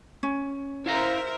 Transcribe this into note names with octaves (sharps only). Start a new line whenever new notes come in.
C#4
E4 A#4 C5 E5 F5 A#5